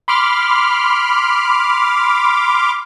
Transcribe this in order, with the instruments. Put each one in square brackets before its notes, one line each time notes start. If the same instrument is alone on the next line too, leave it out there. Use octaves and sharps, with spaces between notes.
[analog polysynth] B5 C6 D6 F6